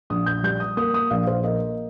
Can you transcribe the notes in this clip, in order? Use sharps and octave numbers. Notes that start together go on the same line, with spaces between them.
A#1 D#6
G6
G3 G6
D#6
A#3 D#6
D#6
A#1 F5
C5
A#3 D#5